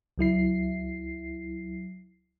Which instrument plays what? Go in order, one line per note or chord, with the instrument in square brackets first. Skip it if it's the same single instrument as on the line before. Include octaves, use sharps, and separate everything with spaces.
[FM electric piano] C#2 F#3 E4 C7